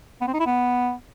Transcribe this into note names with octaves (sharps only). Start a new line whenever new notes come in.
B3
C4
D#4
E4
B3